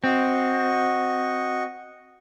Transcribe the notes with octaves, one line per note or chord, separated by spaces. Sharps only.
C4 F#4 D#5 C#6